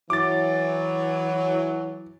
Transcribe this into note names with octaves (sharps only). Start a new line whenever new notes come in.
E3 F#3 D6 A6